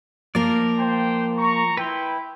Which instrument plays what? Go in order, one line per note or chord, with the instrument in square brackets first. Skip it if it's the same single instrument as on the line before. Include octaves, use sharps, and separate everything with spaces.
[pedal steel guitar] F3 D5 [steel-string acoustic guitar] A#3 A#4
[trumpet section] C5 G5
A#5 C#6
[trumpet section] E4 G5 [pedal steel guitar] B4 C6